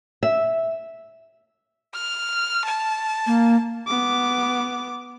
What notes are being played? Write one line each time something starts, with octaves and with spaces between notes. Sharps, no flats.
E5
F6
A5
A#3
B3 D6